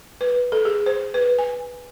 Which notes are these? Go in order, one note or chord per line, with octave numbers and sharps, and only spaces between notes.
B4
A4
G#4
C5
B4
G#5